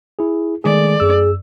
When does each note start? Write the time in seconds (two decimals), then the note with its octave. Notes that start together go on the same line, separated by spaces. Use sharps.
0.19 E4 G#4
0.64 D#3 G#3 A3 G#4 D5
1.00 F#2 G#4 E6